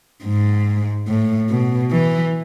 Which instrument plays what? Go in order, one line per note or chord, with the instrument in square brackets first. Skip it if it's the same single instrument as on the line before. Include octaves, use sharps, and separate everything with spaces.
[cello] G#2
A2
B2
E3